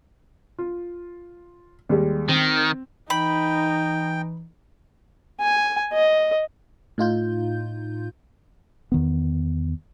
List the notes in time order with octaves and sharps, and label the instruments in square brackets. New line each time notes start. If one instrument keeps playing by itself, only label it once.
[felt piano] F4
D#2 G3 G#3
[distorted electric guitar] D#3 [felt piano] C4
[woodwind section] E3 [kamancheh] D#4 [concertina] G5 [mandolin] B5
[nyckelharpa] G#5
D#5
[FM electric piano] A2 D#4 F4 G6
[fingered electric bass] E2 D#3 B3